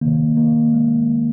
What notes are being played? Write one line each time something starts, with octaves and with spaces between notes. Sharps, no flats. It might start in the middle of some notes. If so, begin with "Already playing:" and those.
C3 D#3 A#3
A#3
G#3